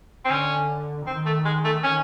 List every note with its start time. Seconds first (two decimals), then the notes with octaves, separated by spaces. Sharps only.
0.25 C4
0.30 D3 C#4
1.07 D#3 C4
1.26 A3
1.45 G#3
1.65 A3
1.83 C#4